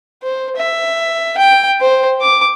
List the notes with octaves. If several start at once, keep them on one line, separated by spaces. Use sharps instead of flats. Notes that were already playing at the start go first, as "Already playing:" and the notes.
C5
E5
G5
C5
D6